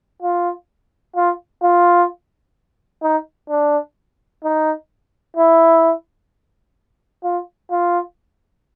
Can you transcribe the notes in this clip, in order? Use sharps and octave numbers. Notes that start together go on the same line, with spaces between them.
F4
F4
F4
D#4
D4
D#4
E4
F4
F4